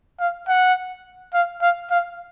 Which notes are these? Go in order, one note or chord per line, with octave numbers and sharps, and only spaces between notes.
F5
F#5
F5
F5
F5